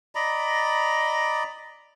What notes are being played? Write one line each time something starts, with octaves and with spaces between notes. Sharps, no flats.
D5 D#5 A#5 B5